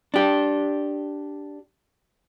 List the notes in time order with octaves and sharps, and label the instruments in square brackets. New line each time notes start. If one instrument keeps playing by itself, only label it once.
[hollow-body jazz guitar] D4 G4